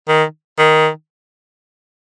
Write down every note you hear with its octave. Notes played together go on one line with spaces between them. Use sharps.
D#3
D#3